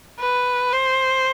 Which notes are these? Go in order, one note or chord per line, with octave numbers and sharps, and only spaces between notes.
B4
C5